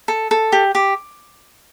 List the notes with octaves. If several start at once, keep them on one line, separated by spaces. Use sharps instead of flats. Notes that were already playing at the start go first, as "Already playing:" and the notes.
A4
A4
G4
G4